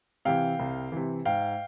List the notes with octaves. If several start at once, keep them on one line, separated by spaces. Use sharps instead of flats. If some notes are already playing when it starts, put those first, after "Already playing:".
C3 E3 F5 G5
C2
C3 E3
G#2 F5 G5